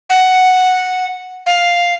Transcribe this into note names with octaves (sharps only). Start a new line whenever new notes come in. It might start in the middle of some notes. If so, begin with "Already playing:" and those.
F#5
F5